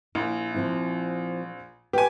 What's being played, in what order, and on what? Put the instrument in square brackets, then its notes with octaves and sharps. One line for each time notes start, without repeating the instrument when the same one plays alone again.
[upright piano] A#1 [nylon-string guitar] A#3 E4
[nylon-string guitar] F3 C4 E4
[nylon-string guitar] F4 B4 [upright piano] G4 G#5